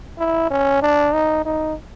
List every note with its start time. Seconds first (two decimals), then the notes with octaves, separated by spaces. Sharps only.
0.19 E4
0.51 C#4
0.82 D4
1.14 D#4
1.45 D#4